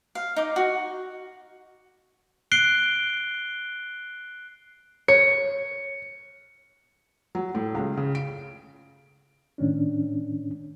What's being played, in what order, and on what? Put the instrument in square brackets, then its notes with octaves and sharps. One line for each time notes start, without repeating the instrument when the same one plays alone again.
[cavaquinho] F5
D#4 D6
F#4
[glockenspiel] F#6 C7 D7 G7
[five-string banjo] C#5 [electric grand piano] C#7
[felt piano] F#3
A2
C#2
C#3
D7
[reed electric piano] A2 D#3 C#4 D4